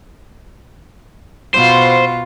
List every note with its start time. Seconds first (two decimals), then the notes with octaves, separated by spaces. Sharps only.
1.54 B2 F4 C5